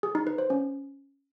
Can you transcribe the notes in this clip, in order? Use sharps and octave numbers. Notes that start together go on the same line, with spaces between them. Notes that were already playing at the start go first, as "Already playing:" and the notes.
G#4
D#4
B4
C5
C#4